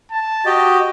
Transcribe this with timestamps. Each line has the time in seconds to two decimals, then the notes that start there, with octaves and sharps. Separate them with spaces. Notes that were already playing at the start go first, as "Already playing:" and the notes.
0.11 A5
0.46 F#4 G4 D#5